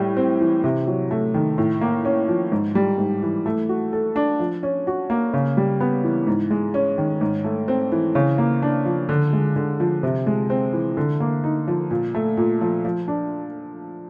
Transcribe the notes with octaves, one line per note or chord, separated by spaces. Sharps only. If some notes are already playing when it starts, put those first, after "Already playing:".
Already playing: A2 G3
C4
E3
C3
F#3
A3
D#3
A2
A#3
C#4
F3
G#2
G3
G#2
E3
A3
F#4
A4
D4
F3
C#4
F#4
A#3
C#3
G3
B3
E3
G#2
G#3
C#4
D#3
G#2
A3
C4
E3
C#3
A#3
D4
F3
D3
G#3
D3
F3
C3
G#3
C4
E3
D3
A#3
D#4
F3
A#2
A3
A#2
F3
F3
D4